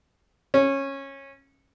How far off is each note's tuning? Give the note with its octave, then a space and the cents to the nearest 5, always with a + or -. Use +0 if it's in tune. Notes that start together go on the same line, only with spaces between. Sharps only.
C#4 -15